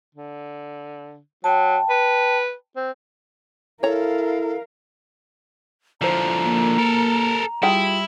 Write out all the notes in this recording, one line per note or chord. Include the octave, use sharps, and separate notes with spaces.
D3
F#3 G5 A5
B4
C4
E4 A4 A#4 C#5 F5 A#5
D3 F3 E4 C5 A#5
A#3
A4 A#4
G3 E4 F4 G#4 G5